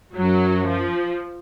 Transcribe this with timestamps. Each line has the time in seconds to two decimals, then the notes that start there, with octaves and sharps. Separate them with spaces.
0.15 F#2 F#3
0.67 F3